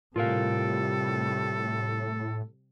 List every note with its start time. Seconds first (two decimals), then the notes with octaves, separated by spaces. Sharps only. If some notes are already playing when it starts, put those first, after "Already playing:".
0.16 A2 C3 G3 F4 A4 A#4 F5